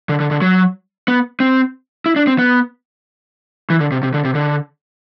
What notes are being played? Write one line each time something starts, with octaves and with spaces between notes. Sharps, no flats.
D3
D3
D3
F#3
B3
C4
E4
D4
C4
B3
E3
D3
C3
C3
D3
C3
D3